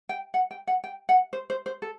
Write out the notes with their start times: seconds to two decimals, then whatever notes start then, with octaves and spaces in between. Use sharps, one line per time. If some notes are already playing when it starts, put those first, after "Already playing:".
0.09 G5
0.34 F#5
0.51 G5
0.67 F#5
0.84 G5
1.09 F#5
1.33 C5
1.50 C5
1.66 C5
1.82 A4